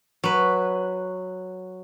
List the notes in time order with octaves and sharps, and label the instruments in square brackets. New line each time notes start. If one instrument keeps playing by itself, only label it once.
[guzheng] F#3 B4